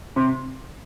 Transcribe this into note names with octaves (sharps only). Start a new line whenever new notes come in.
C3